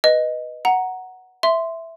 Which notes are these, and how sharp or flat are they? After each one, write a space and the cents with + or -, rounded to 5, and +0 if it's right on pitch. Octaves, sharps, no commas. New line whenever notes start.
B4 +0 D#5 +0
F#5 +0 A#5 +0
E5 +0 C6 -5